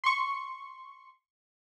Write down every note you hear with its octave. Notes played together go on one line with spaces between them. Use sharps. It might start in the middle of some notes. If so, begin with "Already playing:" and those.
C6 C#6